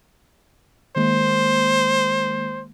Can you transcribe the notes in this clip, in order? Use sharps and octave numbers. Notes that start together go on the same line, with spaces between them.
D#3 G#3 A#3 C5